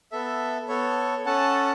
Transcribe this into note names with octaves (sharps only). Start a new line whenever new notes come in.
B3 A4 E5
B3 A4 C#5
C#4 A4 F#5 A5